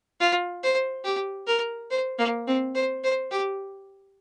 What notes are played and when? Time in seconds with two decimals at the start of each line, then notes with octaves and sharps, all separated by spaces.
0.20 F4
0.63 C5
1.04 G4
1.47 A#4
1.91 C5
2.18 A#3
2.47 C4
2.75 C5
3.04 C5
3.31 G4